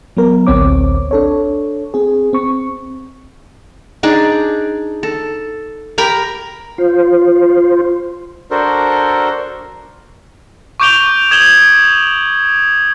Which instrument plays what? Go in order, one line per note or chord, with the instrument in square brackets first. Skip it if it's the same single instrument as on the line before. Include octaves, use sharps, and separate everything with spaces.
[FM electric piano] F#3 B3 A#4
A1 D2 C4 C#5 D6
D4 A4 C#5
C4 G#4
C4 C#6
[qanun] D4 D#4 G#4 D5
A4
G4 A#4 A#5 B5
[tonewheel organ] F4 C5
[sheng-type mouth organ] D4 F#4 A4 A#4 C5
[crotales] C#6 D6 G6 D7 F7 G7
D#6 G#6 E7 F#7 G7